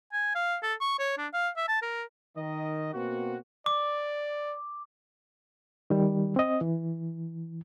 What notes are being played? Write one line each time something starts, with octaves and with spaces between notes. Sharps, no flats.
G#5
F5
A4
C#6
C#5
D4
F5
E5
A5
A#4
D#3 D#5
B2 A#3 C4 F#4
D5 D6
D#3 G3
C4 D#5
E3